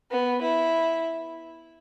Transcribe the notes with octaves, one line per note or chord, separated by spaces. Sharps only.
B3
E4